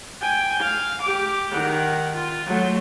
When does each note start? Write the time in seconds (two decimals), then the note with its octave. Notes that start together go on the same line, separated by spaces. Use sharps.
0.21 G5 G#5
0.60 F5
1.02 G4 D6
1.51 D#3 F#5
2.15 F4
2.46 F#3 A3